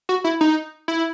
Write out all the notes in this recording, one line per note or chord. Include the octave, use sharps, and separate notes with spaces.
F#4
E4
D#4
E4